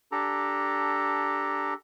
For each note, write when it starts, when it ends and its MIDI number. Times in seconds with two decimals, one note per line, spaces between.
0.12 1.74 62
0.12 1.74 67
0.12 1.74 69
0.12 1.74 82